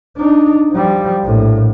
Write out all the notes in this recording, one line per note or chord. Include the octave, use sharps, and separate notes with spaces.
D4 D#4
F3 G3
A#1 A2